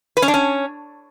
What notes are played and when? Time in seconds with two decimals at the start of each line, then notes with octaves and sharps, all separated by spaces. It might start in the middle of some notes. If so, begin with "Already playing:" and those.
0.17 B4
0.22 C#4
0.28 D4
0.34 C#4